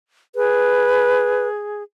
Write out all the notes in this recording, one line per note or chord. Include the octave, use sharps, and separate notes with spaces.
G#4 B4